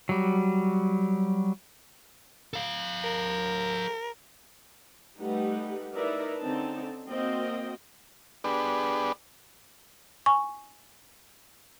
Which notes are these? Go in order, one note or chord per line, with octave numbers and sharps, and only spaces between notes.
F#3 G3
A4 F5
A#4
G3 A3 D#4 G4 B4 F#5
D#4 E4 A#4 B4 D5 E5
D3 C4 C#4 D#4 A5
A#3 C4 F#4 C5 D#5 G5
B3 D4 G4 G#4 B4 D5
G#5 C#6